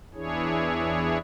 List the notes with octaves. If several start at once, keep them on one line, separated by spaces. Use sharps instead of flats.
E2 E3 D4 E4 G#4 C#5